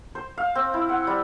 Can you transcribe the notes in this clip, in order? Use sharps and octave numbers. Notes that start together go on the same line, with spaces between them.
C5
F5
C4
E4
F#5
G3